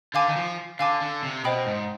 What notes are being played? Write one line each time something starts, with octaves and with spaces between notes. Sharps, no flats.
D3 F5 G#5 D6
D#3
F3
D3 F5 G#5 D6
D3
C3
B2 C5 D#5 G5 B5 D#6
G#2